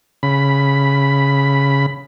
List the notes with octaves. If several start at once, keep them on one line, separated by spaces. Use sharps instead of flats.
C#3 B5